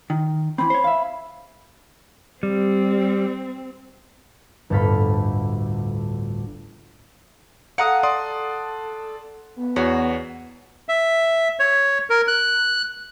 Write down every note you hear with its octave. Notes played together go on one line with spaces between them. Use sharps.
D#3
E3 C4 B5
C5 C#5
E5 F5
G3 C4
G1 D2 A2 A4 F5 B5
A4 F5 F#5 A#5 D#6
D5 C6 D#6
B3
E2 F#4 C#5
E5
C#5
A#4
F#6